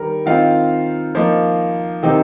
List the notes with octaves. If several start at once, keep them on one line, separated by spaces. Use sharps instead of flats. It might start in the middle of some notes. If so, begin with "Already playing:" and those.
Already playing: D#3 G3 A#4
D#3 C4 D#4 F4 F5
F3 A#3 D#4
C3 D#3 C4 D#4